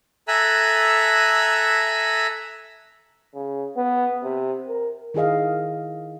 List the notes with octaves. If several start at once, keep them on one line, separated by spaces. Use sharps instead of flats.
A4 E5 G#5 A#5 E6 F#6
C#3
B3
C3
A#4
D#3 E4 G#4 D#5 F5